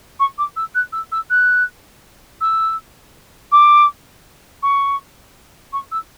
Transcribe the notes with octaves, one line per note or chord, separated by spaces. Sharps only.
C#6
D6
E6
F#6
E6
E6
F#6
E6
D6
C#6
C#6
E6